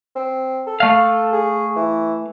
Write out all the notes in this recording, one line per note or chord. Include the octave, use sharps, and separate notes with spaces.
C4
A4
A3 F5
G#4
E3